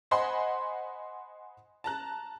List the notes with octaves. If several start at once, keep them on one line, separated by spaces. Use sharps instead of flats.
C5 D#5 F#5 G#5 B5 C6
A5 A#5 F#6